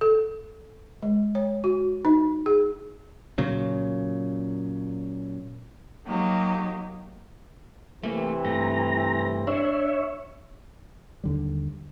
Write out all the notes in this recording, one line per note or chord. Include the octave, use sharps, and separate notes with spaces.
A4
G#3
C#5
F#4
D#4
G#4
A#2 C#3 F#3
F#3 A#3 D#4 G4
C3 E3 A3 A#3 C4
G2 A3 A#5
D4 C#5 E5
D#2 D3 G3